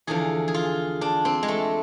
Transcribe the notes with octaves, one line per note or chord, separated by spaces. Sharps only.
E2 D3 F3 G#4
G#4
F4
D4
C4
G#3
A3